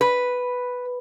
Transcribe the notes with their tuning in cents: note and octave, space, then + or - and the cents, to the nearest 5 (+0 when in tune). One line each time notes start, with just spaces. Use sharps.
B4 +0